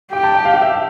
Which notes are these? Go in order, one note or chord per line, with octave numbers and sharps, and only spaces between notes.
G4 G5
A5
G5
F5
E5